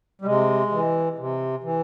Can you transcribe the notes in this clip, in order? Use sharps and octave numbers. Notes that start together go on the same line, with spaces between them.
G3
C3 G#3
E3
C3
E3